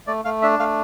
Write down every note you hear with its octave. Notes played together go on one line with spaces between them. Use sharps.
A3 D5
A3 F5
D4 E5
A3 F5